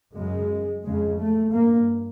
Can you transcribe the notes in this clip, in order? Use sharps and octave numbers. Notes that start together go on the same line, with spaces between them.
F#2 C#3 G#3
F2 C#3 G#3
A3
G2 A#3